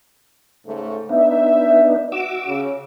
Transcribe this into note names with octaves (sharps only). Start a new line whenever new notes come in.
G#2 C#3 A3
B3 D4 D#4 E5
F#4 D6 E6
C#3